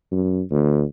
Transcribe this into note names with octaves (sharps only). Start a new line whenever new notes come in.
F#2
D2